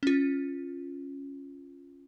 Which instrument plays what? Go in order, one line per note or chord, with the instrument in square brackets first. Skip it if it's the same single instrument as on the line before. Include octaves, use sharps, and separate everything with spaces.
[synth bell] C#4 F4